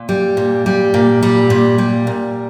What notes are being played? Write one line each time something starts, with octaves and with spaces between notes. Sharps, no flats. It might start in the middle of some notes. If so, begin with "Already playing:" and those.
Already playing: A#2
G3
A#2
G3
A#2
G3
A#2
G3
A#2